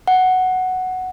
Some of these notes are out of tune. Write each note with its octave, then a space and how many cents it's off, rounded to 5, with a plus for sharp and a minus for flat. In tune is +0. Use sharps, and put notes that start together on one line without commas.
F#5 +5